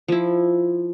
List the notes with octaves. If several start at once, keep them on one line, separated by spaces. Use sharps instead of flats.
F3 E4